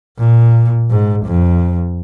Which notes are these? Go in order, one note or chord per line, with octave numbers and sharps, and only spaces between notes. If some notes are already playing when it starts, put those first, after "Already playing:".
A#2
G#2
F2